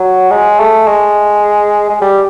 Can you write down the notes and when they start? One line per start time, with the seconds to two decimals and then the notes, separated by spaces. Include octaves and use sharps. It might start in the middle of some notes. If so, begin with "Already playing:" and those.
Already playing: F#3
0.31 G#3
0.60 A3
0.88 G#3
1.90 G#3
2.01 G3